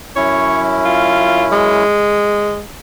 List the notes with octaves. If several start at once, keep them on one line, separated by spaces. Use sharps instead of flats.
F#2 C#4 E4 C#5
F4
G#3